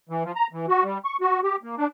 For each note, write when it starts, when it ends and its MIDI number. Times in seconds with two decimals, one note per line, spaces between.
0.09 0.23 52
0.24 0.32 53
0.35 0.47 82
0.52 0.66 52
0.69 0.83 66
0.84 0.98 55
1.05 1.17 85
1.21 1.40 66
1.43 1.56 67
1.63 1.75 58
1.77 1.87 62